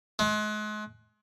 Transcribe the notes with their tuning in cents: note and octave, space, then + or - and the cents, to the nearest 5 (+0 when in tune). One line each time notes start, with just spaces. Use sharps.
G#3 +35